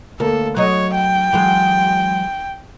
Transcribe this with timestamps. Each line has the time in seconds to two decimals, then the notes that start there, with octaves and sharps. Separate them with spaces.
0.20 D2 A#3 A4
0.56 F#3 C#5 D#5
0.94 G5
1.33 E3 F#3 G#3